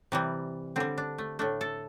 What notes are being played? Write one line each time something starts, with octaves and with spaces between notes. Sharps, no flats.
C3 E3 G3
D3 G3 C4
D4
A3
A2 A3 D4
A4